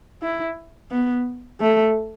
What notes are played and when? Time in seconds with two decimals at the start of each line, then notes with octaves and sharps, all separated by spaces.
0.22 E4
0.91 B3
1.60 A3